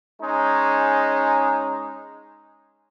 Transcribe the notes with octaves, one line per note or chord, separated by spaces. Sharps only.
G#3 C#4 D#4